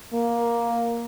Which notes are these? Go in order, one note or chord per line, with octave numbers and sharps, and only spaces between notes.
A#3